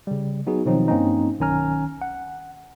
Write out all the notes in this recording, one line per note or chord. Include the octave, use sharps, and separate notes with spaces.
C#3 G3
F#3 B3 D#4 F#4 G#4
B2 D#3 F3 F#3 C4 D#4
G2 A#3 C4 C#4 D#4
B1 D#3 C#4 G#5 A#5 F6
F#5